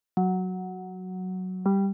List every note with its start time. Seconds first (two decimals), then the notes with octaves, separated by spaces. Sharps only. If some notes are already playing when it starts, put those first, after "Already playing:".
0.17 F#3
1.66 G3